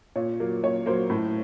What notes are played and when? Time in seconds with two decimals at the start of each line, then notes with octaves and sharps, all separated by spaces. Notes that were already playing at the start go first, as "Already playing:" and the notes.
0.16 A#2 C#5
0.40 F#3 A#3
0.63 A#2 C#5
0.86 F#3 A#3 C5
1.10 A2